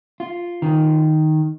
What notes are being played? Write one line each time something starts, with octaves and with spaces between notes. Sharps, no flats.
F4
D#3